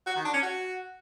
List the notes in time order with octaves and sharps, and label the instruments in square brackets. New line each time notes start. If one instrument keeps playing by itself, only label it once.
[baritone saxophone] F#4
D#3
D4
C#4
F#4